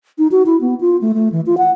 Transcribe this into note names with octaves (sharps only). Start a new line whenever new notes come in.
D#4
F#4
E4
B3
F4
A3
A3
E3
F4
F#5